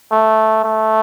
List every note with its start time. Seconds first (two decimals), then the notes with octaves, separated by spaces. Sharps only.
0.12 A3
0.64 A3